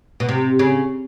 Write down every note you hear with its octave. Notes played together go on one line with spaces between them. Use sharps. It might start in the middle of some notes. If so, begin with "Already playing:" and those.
B2
C3
C#3